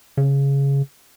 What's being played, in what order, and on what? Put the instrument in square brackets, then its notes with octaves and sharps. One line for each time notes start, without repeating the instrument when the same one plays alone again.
[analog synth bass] C#3